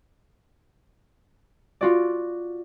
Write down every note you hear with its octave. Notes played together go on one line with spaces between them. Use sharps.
F4 F#4 D5